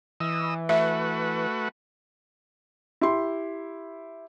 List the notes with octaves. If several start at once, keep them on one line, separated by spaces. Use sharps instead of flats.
E3 D#5 E6
A3 F#4 B4 E5
E4 G4 C6